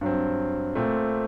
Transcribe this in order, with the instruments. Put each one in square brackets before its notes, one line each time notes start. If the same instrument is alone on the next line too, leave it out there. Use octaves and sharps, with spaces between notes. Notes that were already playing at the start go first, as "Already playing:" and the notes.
[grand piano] G2 F#3 C4
A#2 A3 C4